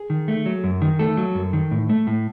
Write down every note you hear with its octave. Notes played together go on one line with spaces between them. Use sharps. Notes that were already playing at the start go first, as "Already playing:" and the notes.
Already playing: G#4
D#3
A3
F#3
F#2
D#3
A3 A4
F#3
F#2
D#3
A2
A3
A2